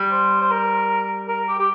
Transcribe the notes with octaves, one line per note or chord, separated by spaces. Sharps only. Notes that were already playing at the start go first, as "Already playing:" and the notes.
Already playing: G3
C5
C5
A#4
A#4
G4
G4